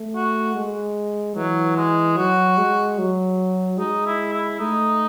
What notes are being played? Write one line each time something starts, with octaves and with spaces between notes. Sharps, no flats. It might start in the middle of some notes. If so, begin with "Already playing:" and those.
Already playing: A3
F#4
G#3
E3 F#3
G#3
F#3 F#4
G#3
F#3
G#3 D#4
E4
E4
A3 D#4